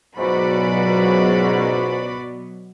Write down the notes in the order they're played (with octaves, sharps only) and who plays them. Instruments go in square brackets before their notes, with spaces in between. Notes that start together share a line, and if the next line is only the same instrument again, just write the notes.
[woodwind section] C#2 G#2 [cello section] B2 F#3 B3 [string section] F#4 D5 B5